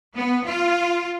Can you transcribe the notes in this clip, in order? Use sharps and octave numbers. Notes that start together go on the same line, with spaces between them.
B3
F4